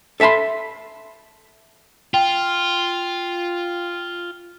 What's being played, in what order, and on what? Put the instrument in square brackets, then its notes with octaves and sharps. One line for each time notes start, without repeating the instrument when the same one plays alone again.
[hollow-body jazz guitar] A4 E5 A5 B5 C6
[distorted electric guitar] F4 [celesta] G5